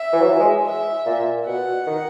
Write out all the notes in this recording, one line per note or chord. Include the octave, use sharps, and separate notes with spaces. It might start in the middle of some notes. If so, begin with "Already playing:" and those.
Already playing: E5
E3
F#3
E3
G#3
E5
A#2
B2 F#5
D#3